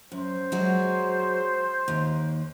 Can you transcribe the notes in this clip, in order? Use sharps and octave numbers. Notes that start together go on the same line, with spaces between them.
F#2 C5
F#3 G#3 F#4
D#2